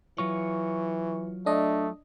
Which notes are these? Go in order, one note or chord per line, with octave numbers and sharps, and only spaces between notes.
E3 F#3 F4 C#5 C#6
A3 D4 D#5